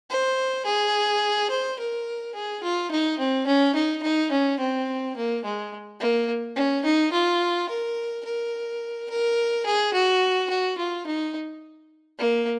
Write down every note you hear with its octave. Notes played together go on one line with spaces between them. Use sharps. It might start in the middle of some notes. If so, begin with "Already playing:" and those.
C5
G#4
C5
A#4
G#4
F4
D#4
C4
C#4
D#4
D#4
C#4
C4
A#3
G#3
A#3
C#4
D#4
F4
A#4
A#4
A#4
G#4
F#4
F#4
F4
D#4
A#3